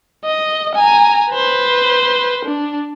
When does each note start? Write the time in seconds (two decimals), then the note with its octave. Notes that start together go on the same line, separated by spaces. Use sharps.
0.25 D#5
0.75 G#5 A#5
1.31 B4 C5
2.46 D4